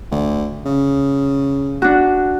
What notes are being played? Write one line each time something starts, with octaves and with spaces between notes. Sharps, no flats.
D2
C#3
D4 F#4